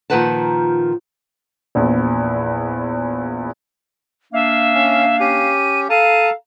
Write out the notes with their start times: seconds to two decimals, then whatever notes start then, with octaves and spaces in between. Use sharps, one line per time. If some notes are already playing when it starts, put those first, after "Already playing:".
0.10 A#2 D#3 F3 B4 F#5 A5
1.75 A#1 E2
4.33 A#3 D4 E5 F5
4.74 C#4
5.20 C#4 G4 D#7
5.90 A4 F5 A5 A#5 D#7